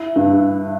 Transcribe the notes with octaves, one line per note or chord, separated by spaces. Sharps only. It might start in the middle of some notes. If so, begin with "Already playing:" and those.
Already playing: E4
G2